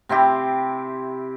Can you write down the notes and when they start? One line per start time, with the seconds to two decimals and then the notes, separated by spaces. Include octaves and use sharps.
0.09 C3 C4 E4 G4